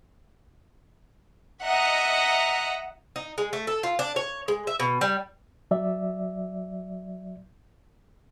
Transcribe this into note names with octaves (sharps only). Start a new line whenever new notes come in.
D#5 E5 F#5 A#5
D#4
G#3
A3
A4
F4
D4
C#5
G#3
E5
B2
G3
F#3 D5 E5